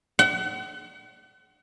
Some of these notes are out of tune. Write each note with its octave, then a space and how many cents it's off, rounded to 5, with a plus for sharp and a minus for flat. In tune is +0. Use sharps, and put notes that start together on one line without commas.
F#5 +40